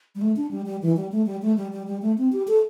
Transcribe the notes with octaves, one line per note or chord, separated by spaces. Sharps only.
G3
A3
D4
G3
G3
E3
G3
A3
G3
A3
G3
G3
G3
A3
C4
G4
A4